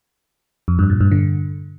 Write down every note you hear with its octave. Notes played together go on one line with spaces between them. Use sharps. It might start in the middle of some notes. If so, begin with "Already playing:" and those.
F2
G2
A#2
G2
D3